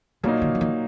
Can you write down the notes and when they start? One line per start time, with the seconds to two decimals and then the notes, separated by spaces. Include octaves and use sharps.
0.23 A#2 C#3 F#3 A#3 D#4
0.42 D3
0.55 E3
0.61 D#3